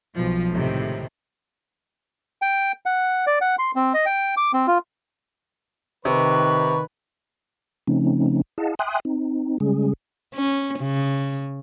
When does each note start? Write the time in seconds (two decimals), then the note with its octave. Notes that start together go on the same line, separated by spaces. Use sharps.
0.15 B1 F3
0.52 C#2 A2 C3 D#3
2.42 G5
2.86 F#5
3.27 D5
3.41 F#5
3.59 C6
3.76 C4
3.94 D#5
4.06 G5
4.37 D6
4.54 C4
4.67 F4
6.05 C3 D#3 B4 C#6
7.88 C#3 F3 A3 C4 C#4 D#4
8.58 E4 G#4 D#5 F5 F#5 A5
8.79 E5 G5 G#5 C6 D#6 F#6
9.05 C4 D#4
9.60 C#3 G3 G#3 C#4 G#4
10.35 C#4
10.79 C#3